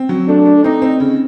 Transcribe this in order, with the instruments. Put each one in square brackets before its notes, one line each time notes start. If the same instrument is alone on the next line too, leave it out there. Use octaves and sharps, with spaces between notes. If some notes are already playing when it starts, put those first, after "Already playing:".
Already playing: [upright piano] C4
F#3
[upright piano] A3 [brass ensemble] D4
[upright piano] A3
[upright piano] C4 [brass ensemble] D#4
[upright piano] C4
C#3